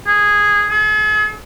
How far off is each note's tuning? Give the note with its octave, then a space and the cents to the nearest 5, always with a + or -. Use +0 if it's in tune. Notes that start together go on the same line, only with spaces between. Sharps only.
G#4 -10
G#4 +45